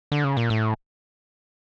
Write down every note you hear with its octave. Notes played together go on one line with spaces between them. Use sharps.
D3
C#3
A#2
A2